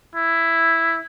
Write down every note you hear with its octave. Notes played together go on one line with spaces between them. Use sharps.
E4